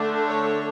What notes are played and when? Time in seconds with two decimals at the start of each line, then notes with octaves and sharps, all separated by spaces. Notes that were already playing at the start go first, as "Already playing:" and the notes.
Already playing: D3 A3 D4
0.26 C#5